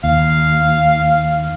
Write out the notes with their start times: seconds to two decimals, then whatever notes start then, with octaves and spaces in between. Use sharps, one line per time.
0.04 D#2 F5